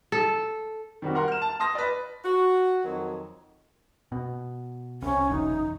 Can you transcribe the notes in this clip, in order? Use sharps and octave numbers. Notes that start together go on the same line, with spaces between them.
A4
D#3 G3 C4 F#4
A#4 F#5 C6
F6 E7
A5
A5 C6 D#6 A#6
B4 D5
F#4
F2 D#3 F#3
B2
C2 C#4
F#1 B1 E2 D#4